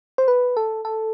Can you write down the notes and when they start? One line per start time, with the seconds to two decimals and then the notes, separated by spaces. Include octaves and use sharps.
0.18 C5
0.28 B4
0.57 A4
0.85 A4